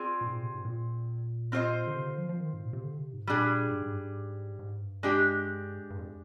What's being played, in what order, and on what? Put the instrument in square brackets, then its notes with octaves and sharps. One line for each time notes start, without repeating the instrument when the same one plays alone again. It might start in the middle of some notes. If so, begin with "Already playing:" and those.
Already playing: [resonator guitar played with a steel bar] C4 F4 G#4 D5
[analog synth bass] A#2
G#2
A#2
C3
G#2
A#2
[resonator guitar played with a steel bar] C4 F4 C5 D#5
[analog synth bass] D3
C3
D3
F3
F3
D#3
G#2
A#2
C3
D3
C3
G#2
[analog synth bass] A#2 [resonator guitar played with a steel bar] G3 D4 G#4
[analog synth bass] G#2
G#2
G2
G#2
G#2
G2
[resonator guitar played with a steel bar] G#3 D4 G4
[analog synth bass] G2
F2